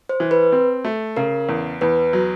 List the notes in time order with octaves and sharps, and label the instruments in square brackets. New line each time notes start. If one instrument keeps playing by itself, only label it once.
[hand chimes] C5
[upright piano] E3
[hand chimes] B4
[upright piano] C4
A3
[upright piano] C#3 [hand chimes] A#4
[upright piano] E2
[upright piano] E2 [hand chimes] B4
[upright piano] F#3